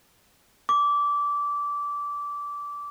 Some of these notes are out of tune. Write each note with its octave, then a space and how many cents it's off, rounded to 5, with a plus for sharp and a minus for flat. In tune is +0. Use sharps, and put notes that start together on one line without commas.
D6 -20